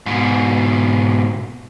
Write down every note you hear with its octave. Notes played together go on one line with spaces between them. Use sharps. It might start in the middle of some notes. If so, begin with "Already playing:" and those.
G#2 B2